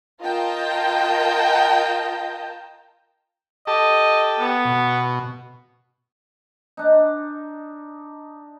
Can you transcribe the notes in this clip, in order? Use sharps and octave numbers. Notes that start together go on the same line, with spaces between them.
F4 A#4 D#5 G5 A5 A#5
G4 A4 D#5 A5
B3
B2
D4 D#4